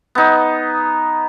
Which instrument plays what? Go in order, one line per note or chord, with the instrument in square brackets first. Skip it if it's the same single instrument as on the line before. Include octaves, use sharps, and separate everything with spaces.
[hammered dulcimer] B3 D#4